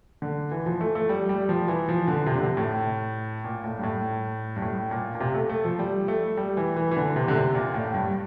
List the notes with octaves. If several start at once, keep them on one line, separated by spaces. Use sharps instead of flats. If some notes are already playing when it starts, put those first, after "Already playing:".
D3
E3
F3
A3
A3
G3
G3
F3
E3
F3
D3
C3
D3
C3
A2
A#2
A2
G2
A2
G2
A2
A#2
A#2
C3
A3
A3
F3
G3
A3
G3
E3
E3
E3
D3
C3
D3
C3
A#2
A2
G2